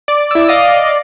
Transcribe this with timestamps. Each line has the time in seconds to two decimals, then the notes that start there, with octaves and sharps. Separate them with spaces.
0.08 D5
0.31 E4 E6
0.49 D#5 F5